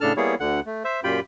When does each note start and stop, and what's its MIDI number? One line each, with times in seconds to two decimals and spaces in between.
0.01 0.13 45
0.01 0.13 49
0.01 0.13 62
0.01 0.13 69
0.01 0.13 81
0.01 0.13 89
0.17 0.35 55
0.17 0.35 58
0.17 0.35 59
0.17 0.35 64
0.17 0.35 68
0.17 0.35 73
0.40 0.60 38
0.40 0.60 50
0.40 0.60 78
0.66 0.83 57
0.84 1.00 72
0.84 1.00 76
1.04 1.20 42
1.04 1.20 46
1.04 1.20 65
1.04 1.20 67
1.04 1.20 79
1.04 1.20 83